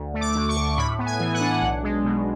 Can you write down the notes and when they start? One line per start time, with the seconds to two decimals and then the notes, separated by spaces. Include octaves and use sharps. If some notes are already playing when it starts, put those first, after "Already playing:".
Already playing: D2
0.14 A3
0.21 D6
0.35 D3
0.49 C#6
0.56 D2
0.78 A2 B5
0.99 B3
1.06 G#5
1.20 E3
1.34 F#5
1.41 D4
1.62 B1
1.83 G#3
2.05 B2